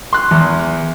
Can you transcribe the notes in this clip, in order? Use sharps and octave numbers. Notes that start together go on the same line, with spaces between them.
C6 F#6
E2